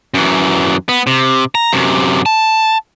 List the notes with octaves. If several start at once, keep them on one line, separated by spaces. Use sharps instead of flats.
F#2 E3
B3
C3
A#5
F#2 C3
A5